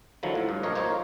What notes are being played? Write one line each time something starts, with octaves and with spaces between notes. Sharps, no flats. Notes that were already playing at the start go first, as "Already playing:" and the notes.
D3 D#3 F3 F#3 E4
A2 F3
G2
A#1 F3 A#4 C#5 D#5
A#3 D#4 F4 C5 C#5